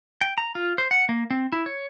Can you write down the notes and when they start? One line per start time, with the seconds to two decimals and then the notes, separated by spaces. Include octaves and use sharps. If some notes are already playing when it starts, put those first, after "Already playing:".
0.21 G5
0.38 A#5
0.55 F4
0.78 C5
0.91 F#5
1.09 A#3
1.30 C4
1.52 E4
1.66 C#5